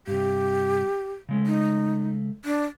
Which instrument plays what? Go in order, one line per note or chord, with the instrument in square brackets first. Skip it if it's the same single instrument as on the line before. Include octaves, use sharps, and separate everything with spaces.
[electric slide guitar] G2 C3 [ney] G4
[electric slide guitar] C#3 G#3 A3
[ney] D#4
D4